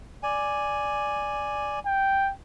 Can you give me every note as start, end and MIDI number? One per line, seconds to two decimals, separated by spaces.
0.23 1.79 74
0.23 1.79 80
1.86 2.31 79